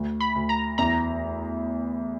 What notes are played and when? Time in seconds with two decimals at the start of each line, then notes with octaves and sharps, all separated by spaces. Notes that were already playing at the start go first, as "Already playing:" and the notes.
Already playing: D2
0.20 B5
0.35 D2
0.49 A#5
0.78 E2 A#5